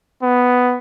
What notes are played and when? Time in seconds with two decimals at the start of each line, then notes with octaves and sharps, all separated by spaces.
0.22 B3